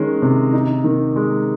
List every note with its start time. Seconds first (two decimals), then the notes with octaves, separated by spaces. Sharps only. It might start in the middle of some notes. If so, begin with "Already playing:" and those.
Already playing: D#3 G#3 C#4
0.22 C3
0.53 D#4
0.84 D#3
1.16 G#3